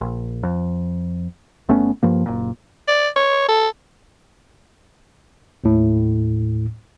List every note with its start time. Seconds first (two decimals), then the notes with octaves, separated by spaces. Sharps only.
0.01 A#1
0.43 F2
1.69 G1 A3 B3 C#4
2.03 G2 F3 A#3
2.26 F#1 A#2
2.88 D5
3.17 C#5
3.49 A4
5.64 D#2 A2